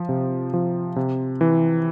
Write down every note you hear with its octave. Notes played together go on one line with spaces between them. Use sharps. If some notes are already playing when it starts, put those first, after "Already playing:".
Already playing: F3
C3
F3
C3
E3